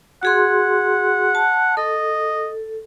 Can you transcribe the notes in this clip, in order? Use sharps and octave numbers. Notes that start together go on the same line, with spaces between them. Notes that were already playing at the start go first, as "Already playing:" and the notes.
F#4 G#4 F#5 C6
A5
A4 D#5